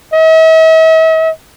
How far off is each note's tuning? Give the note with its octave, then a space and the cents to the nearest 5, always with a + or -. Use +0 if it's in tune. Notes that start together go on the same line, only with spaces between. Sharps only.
E5 -45